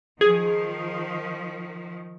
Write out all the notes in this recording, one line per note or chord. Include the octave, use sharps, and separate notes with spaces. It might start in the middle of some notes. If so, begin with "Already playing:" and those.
D#3 F3 G#4